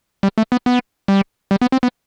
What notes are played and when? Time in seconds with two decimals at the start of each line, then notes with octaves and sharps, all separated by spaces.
0.23 G3
0.38 A3
0.52 B3
0.66 B3
1.08 G3
1.51 G3
1.61 B3
1.72 C4
1.83 B3